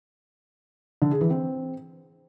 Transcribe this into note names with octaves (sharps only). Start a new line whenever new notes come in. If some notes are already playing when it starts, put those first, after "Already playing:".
D3
G#4
E3
C4